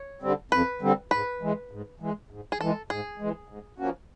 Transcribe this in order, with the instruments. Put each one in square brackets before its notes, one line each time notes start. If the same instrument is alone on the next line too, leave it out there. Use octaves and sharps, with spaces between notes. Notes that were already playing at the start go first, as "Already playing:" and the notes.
Already playing: [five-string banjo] C#5
[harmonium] D3 G3 C4
[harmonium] F2 [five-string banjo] B4
[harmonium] D3 G3 C4
[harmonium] G#2 [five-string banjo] B4
[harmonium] E3 G#3
G#2
E3 G#3
G#2
[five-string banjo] G#4
[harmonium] E3 G#3 [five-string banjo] A4
[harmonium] G#2 [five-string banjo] G#4
[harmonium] E3 G#3
G#2
F3 A#3 C#4 F#4